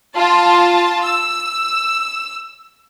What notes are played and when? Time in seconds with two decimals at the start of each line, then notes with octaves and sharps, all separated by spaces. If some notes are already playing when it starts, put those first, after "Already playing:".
0.16 F4 A5
1.04 E6